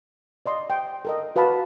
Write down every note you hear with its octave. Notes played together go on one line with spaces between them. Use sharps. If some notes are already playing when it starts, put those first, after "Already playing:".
D5 D#5 C6
G5
A4 A#4 D#5
F#4 B4 F5 A5 B5